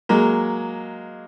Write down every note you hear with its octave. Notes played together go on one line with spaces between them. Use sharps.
F#3 G#3 A#3